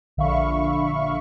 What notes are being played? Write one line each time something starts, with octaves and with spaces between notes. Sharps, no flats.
A#1 D3 E5 F5 B5 C#6